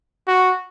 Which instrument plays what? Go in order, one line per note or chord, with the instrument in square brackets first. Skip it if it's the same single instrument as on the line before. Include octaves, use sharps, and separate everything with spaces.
[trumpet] F#4